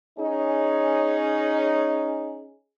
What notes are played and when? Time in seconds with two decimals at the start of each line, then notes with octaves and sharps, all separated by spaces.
0.19 C#4 D#4 G#4